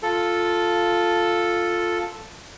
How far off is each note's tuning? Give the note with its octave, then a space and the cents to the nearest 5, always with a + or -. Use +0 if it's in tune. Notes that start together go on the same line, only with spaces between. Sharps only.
F4 +0 A4 +0